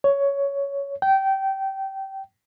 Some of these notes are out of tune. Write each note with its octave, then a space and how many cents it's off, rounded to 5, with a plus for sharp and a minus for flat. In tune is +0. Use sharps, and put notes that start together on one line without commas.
C#5 +10
G5 -20